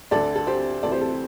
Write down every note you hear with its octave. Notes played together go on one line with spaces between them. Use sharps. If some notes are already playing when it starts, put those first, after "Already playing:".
D2 D3 A4 D5
A4
G4 C5
D2 C3 E3 A4 D5
G4 C5
A4
G4